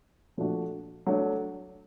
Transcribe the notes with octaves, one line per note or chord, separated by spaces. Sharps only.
A#2 F3 A3 D4 F#4
F#3 A3 D4